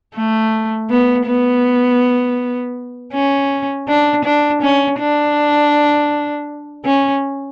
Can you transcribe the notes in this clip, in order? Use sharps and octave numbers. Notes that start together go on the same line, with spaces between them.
A3
B3
B3
C#4
D4
D4
C#4
D4
C#4